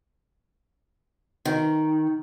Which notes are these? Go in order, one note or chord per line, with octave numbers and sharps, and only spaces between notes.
D#3